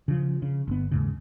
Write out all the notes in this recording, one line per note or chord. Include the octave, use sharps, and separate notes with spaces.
C#3 F3
C#3
G1 B3
D#2 G#2 C#3